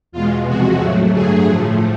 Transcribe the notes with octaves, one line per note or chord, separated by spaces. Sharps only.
E2 B2 G#3 F4
E2 C3 F3 G#3 F#4
A2 F#3 A3
G2 D3 F#3 A3 G#4
A2 F3 A3